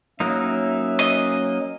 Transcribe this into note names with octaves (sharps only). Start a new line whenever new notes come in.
F#3 A#3 C#4 D#4 E5
D#5